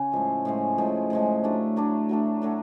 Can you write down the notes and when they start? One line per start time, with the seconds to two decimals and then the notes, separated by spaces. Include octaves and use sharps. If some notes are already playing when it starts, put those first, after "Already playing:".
Already playing: C#3 C#4
0.12 A2 F3 G#3
0.45 A2 F3 G#3
0.78 A2 F3 G#3
1.10 A2 F3 G#3
1.44 F#3 A3 D4
1.76 F#3 A3 D4
2.09 F#3 A3 D4
2.42 F#3 A3 D4